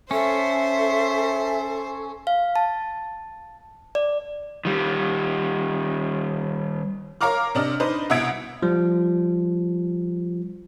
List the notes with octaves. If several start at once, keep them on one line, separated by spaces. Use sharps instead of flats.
C#4 A4 C5 E5
F5
A5
D5
D#3 G3
A#4 C#5 F5 A#5 D6 F6
C3 D4 D#5 F6
D4 D#4 B4 C5
C2 B2 E5 G#6 D7
F3 G3